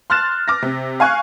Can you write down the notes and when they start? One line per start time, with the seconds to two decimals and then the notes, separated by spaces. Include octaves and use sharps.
0.10 C6 F6 F#6 A6 E7
0.48 D6 F6 A#6
0.62 C3
1.00 F5 G#5 C#6 F#6